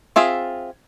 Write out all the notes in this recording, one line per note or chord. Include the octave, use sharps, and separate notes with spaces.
C4 F4 G#4 E5